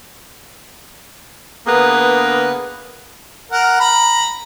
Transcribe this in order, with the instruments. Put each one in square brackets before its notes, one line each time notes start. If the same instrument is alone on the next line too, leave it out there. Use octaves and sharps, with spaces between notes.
[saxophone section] D3 A#3 B3 G#4 A#4 B4
[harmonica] A#4 F#5
A#5 B5